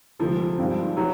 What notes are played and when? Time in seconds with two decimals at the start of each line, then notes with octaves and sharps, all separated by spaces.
0.19 D2 C3 E3 F3 G#3
0.58 G2 D#3 G#3 C4
0.97 E3 F#3